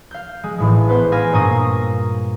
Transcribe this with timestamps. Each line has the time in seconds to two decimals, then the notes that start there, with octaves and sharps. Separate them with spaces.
0.11 F5 G6
0.44 G#3
0.58 A1 A2 G#3
0.88 B3 B4 C5 F#5
1.12 F5 G#5 D6 F6 A#6 B6
1.33 G2 A#2 A#3 C#6 D#6 A#6